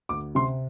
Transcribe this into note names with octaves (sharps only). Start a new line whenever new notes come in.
D2 D6
C3 C6